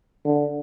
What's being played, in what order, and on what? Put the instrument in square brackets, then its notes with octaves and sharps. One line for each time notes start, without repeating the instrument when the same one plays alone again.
[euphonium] D3